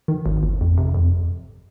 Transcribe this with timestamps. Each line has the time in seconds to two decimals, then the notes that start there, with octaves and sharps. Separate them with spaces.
0.08 D#3
0.26 G#1
0.43 G1
0.61 F2
0.78 C3
0.95 F2